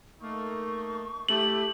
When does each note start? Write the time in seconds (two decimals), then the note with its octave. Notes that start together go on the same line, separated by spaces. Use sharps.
0.21 A3 A#3 D#4 C#6
1.29 A3 E4 G4 F#7